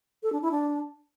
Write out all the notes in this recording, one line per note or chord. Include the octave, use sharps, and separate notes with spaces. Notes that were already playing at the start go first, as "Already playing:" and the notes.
A4
D4
E4
D4